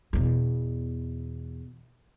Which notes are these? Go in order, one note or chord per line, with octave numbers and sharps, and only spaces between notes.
E2 B2